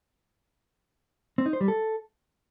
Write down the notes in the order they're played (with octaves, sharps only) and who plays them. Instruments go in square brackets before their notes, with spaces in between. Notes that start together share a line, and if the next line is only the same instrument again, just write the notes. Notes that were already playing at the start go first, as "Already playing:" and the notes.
[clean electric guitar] C4
D#4
C5
G3
A4